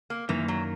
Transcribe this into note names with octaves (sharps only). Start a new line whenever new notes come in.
A#3
F#2 D#3 E3 A#3
F#3